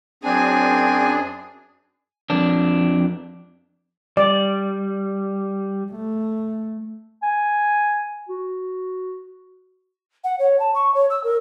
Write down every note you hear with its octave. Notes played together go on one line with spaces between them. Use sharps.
F#2 C4 D4 G#4 G#5
F2 D4
G3 D5
A3
G#5
F#4
F#5
C#5
A5
C#6
C#5
E6
A#4